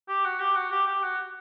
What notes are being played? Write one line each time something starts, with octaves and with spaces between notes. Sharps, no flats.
G4
F#4
G4
F#4
G4
G4
F#4